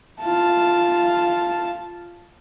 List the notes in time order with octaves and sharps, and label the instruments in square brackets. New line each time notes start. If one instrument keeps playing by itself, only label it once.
[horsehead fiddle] F4 A5